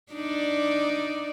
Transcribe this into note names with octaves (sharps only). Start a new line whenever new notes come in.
D4 D#4 D5